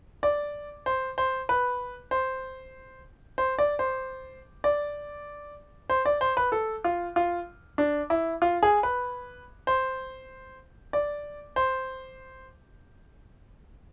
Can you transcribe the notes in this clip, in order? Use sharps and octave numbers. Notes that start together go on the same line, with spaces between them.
D5
C5
C5
B4
C5
C5
D5
C5
D5
C5
D5
C5
B4
A4
F4
F4
D4
E4
F4
G#4
B4
C5
D5
C5